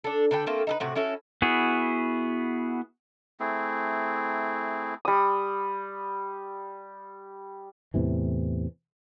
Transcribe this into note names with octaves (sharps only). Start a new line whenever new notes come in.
D4 A4
D3 A4 B4 G5
A3 A#3 C4 A4
D#4 A4 B4
A2 C3 F#4
C#4 E4 F#4 A4
B3 E4 F#4 G#4
A3 C4 E4 G#4
G3 D#6
E2 A2 C3 E3